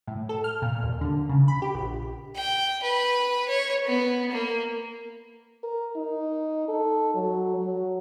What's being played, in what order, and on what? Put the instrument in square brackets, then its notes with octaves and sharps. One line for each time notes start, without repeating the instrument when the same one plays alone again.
[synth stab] A2
A4
F6
A#2
D#2
D3
C#3
B5
G4
A#1
[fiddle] G5
B4
C#5
B3
A#3
[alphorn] A#4
D#4
A4
F#3
F#3